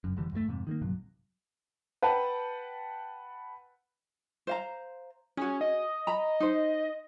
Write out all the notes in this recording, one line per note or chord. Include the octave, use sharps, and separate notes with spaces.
F#1 F#2
F1 D3 E3 G3
E2 G2 F#3 A3
F2 G#2 C3
D#3 G#3 A#3
A#1 G2 C3 F#3
B4 F#5 G5 A5
C5 F5 A#5
C#4 F#4 G#4
D#5
A#5 B5
D#4 C5